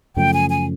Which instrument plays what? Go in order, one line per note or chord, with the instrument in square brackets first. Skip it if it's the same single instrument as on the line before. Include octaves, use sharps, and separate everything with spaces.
[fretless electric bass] F#2 C#3 F3 A3 [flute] G5
[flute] G#5
G#5